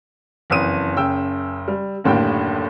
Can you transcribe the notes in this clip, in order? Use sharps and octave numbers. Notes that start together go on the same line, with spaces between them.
F#1 F2 E3 D#6 D#7
F#1 C#3 G5 E6
G3
F#1 D#2 A2 D3 A#3 G5